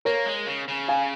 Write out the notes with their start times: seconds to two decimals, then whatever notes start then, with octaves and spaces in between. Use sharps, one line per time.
0.05 A#3 A#4 C#5
0.26 G#3
0.47 C#3
0.68 C#3
0.88 F5 G#5